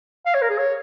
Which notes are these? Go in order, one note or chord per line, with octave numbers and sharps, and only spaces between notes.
F5
C#5
A#4
G#4
C#5